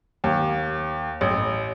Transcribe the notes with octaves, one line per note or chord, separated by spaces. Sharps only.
D#2
A1